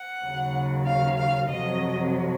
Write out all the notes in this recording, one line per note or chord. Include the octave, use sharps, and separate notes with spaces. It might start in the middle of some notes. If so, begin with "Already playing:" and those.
Already playing: F#5
D#2 C#3 F#3
F5
F5
F2 C3 F#3 D#5